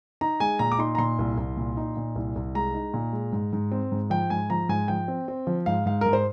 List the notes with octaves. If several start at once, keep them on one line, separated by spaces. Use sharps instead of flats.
D#4 A#5
G#3 G#5
A#2 A#5
D6
D#4 C6
A#5
A#2 C6
C2
C2
A#2
D#4
A#2
C2
C2
G#3 A#5
D#4
A#2
G#3
G#2
G#2
C4
G#2
F3 G5
G#2 G#5
F3 A#5
G#2 G#5
F3 G5
C4
C4
F3
G#2 F5
G#2 F5
G#2 A#4
C5